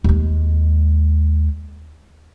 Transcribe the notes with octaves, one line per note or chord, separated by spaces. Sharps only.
D#2 G#3